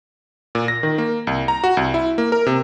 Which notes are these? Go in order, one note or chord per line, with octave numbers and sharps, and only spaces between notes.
A#2
A#6
D#3
A#3
C2
A#5
F#4
C2
E4
A#3
A#4
C3